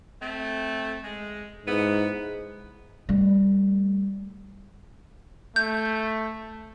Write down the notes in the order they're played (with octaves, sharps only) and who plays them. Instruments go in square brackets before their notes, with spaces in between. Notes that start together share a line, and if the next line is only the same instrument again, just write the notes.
[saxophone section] A3 C4
G#3
[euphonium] G#2 [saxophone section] B3 E4
[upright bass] G3 A3
[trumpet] A3 [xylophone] G6